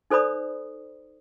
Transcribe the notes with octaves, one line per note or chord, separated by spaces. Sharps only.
D#4 A4 C5 D5 B5 D#6